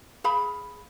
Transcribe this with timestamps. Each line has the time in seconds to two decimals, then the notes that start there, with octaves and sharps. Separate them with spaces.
0.24 G#4 F5 B5